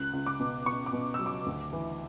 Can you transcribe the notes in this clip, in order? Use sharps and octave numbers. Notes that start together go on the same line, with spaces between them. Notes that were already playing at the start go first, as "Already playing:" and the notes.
Already playing: C#2 F#6
C#2
D6
B2
B2 C#6
D6
B2
F#3 E6
D6
D2
E3